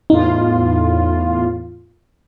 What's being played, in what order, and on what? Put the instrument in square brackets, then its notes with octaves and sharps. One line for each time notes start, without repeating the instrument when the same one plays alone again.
[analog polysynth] E2 A2 F4 [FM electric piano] D#4